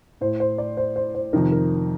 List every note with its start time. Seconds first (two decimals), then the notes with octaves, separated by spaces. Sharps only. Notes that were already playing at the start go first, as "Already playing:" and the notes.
0.21 A2 C5
0.40 C5
0.58 D5
0.77 C5
0.96 C5
1.15 C5
1.33 F2 C3 D#3 A#4
1.52 A#4